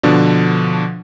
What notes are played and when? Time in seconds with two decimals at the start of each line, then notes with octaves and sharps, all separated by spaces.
0.03 B2 D3 F3 D4